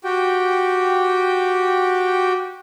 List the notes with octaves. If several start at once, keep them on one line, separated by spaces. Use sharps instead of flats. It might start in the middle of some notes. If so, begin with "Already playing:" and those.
F#4 G4 G5